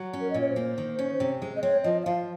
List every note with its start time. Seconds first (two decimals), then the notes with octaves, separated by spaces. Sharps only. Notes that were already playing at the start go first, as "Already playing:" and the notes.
Already playing: F#3
0.13 C#4
0.21 A#4
0.30 D#5
0.34 A#2
0.41 C#5
0.50 C5
0.56 A#3
0.78 D#3
0.99 C#4
1.20 C3
1.42 G#3
1.56 D#5
1.62 C4 C#5
1.84 F3 D#5
2.02 D#5
2.05 F3 F5